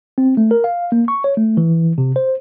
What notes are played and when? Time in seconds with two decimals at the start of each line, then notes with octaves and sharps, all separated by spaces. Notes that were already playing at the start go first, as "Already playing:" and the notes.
0.18 C4
0.37 A3
0.51 A#4
0.64 F5
0.92 A#3
1.08 C#6
1.24 C#5
1.37 A3
1.57 E3
1.98 C3
2.16 C5